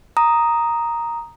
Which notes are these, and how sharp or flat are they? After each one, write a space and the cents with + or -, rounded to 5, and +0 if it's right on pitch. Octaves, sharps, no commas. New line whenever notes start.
A#5 +0 D#6 +0